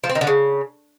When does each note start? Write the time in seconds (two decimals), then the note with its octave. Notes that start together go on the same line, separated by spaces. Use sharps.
0.04 F3
0.09 C4
0.15 D#3
0.21 D3
0.27 C#3